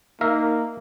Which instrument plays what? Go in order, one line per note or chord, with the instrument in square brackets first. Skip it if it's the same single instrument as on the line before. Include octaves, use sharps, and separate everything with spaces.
[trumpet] A#3 [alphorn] D#4 [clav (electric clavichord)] A#4 E5 F5